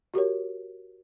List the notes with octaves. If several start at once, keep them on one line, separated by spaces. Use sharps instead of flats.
F#4 G4 A#4 C#5